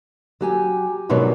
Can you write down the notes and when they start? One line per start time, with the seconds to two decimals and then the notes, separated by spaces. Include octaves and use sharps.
0.41 F#3 G4 G#5
1.09 G#2 B2 D#3 F#3 G3